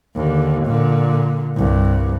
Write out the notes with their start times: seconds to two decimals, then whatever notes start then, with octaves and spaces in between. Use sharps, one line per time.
0.15 D#2 D3
0.65 A#2 D3
1.55 C2 G2